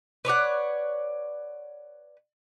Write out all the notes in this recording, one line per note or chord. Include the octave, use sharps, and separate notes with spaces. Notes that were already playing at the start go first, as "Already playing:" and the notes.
B4 C#5 D5 F#5